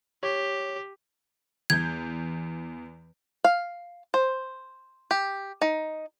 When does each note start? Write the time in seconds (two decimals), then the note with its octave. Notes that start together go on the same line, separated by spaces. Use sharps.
0.23 G4 C#5
1.70 E2 G6 G#6
3.44 F5
4.14 C5
5.11 G4
5.62 D#4